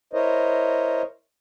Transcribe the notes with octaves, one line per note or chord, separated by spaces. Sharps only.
E4 A#4 C5 C#5 D#5